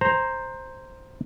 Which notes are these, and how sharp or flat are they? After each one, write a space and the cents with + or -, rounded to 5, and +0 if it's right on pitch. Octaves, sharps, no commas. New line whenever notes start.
C5 +5 A#5 +0